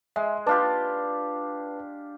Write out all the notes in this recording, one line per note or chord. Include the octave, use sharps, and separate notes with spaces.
G#3 E5
D4 F4 G4 B4 A5